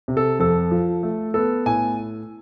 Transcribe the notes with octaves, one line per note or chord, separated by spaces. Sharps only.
C3
A4
F2 A4
F3
A3
B3 A4
A2 G#5